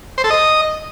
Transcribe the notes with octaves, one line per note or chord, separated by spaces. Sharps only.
C5
A4
D#5